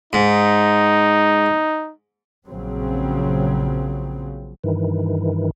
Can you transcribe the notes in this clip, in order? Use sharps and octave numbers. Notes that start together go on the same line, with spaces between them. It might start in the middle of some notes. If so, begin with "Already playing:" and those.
G#2 D#4
A#1 C#3 F#3 C4
G2 D#3 E3